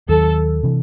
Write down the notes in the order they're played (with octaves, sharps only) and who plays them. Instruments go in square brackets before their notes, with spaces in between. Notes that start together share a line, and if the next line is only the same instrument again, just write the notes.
[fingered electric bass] D#2 D#3 F#3 [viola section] A4
[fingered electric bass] C3 E3